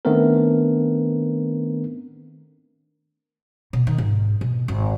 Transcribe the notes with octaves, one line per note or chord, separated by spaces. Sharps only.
D#3 A3 B3 C4 D4 A#4
B2
D#3
G#2
B2
G#1